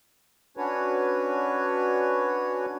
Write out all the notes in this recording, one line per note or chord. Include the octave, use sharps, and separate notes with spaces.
C#4 D4 F#4 B4 C#5